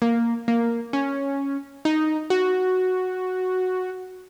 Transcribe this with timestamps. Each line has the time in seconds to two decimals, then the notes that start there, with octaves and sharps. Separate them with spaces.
0.02 A#3
0.48 A#3
0.93 C#4
1.85 D#4
2.30 F#4